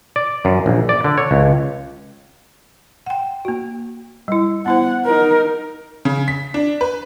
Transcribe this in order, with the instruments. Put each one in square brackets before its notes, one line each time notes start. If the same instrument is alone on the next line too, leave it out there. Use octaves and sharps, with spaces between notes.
[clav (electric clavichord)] D5
F#2
A#1
D5
D3
C#5
C#2
[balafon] F#5 G5
A#3 F#4
G3 E4
[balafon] B3 E4 C5 [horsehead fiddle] F#5
[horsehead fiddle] D#4 A#4
[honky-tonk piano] C#3
B6
D4
B4